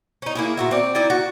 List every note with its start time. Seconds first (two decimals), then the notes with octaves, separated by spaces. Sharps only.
0.22 C#4 D#4
0.35 A#3 E4 G#4
0.57 A#2 F#4 E5
0.71 C4 D5
0.95 D#4 E4 D5
1.10 F#4